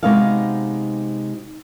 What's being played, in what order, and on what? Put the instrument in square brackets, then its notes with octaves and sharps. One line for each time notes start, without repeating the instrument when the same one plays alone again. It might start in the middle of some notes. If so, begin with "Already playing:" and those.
[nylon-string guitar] C3 G#3 B3 D#4 F#4 F5